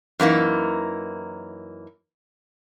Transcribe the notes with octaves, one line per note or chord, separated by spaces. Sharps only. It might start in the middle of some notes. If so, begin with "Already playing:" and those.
F#2 E3 A#3 D#4